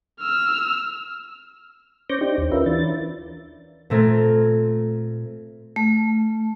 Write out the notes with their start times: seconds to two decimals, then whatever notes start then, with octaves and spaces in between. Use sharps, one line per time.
0.21 E6 F6
2.10 C#4 C5 C#6 D6 G6 A#6
2.21 D4 D#4 G4 C5 D5
2.38 D#2
2.52 C#4 F4 A#4 B4 E5
2.66 E3 D4 A6
3.90 A#2 A3 C4 A#4 G#6
5.76 A3